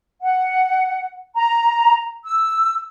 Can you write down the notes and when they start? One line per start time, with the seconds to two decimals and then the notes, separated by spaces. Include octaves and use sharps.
0.23 F#5
1.36 A#5
2.24 E6